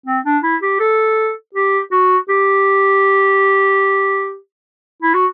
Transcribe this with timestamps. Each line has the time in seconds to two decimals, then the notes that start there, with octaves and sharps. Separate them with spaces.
0.06 C4
0.25 D4
0.43 E4
0.62 G4
0.80 A4
1.54 G4
1.91 F#4
2.29 G4
5.02 E4
5.14 F#4